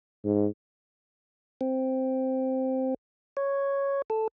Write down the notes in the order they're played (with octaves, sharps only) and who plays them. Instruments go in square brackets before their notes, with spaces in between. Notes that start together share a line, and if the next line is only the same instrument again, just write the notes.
[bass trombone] G#2
[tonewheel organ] C4
C#5
A4